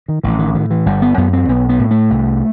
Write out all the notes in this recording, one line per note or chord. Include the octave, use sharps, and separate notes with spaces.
D#3
A1 E3
D#3
A2 D#3
E3
G1 G3
B3
F#2 B3
C4
B1 B3
B3
A2
A3
C2